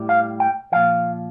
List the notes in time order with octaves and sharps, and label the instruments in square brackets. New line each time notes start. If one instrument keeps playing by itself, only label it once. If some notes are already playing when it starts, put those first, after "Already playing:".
Already playing: [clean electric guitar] A2 G3
F5
G5
A#2 F3 F5